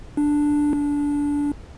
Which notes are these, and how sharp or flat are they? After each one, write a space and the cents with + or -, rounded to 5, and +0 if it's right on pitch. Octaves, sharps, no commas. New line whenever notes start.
D4 +0
D4 -20